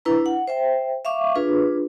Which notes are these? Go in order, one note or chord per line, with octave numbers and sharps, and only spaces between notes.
D4 E4 B4 A#5
F#5
C5 E5 G5
E5 F5 C#6 D6
D4 F4 G#4 B4